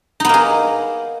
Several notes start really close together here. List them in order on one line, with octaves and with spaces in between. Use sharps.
D#4 B3 A#3 G#4